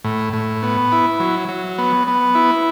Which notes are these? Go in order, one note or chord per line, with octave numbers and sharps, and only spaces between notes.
A2
A2
B3
E4
F#3
F#3
B3
B3
E4